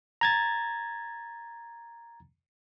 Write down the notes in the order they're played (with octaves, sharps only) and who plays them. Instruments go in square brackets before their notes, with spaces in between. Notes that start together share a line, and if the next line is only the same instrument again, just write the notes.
[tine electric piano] A#5 G#6 A6